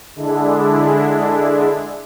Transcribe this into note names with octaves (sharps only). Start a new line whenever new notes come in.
D3 G#3 D4 E4